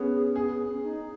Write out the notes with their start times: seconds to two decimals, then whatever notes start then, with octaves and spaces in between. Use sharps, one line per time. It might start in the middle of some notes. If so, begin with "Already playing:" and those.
Already playing: B3 C#4 G#4
0.35 B3 G#4
0.69 C#4
0.85 D#4